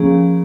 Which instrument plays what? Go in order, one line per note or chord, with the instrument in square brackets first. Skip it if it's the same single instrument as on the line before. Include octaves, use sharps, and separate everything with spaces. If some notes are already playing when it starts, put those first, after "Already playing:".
Already playing: [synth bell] F3 A#3 C#4 G#4